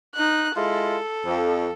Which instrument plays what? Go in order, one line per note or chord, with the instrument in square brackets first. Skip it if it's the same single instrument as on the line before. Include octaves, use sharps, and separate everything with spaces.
[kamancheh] D#4 F#6
[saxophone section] G#3 E4 F4 [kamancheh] A4
[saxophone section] F2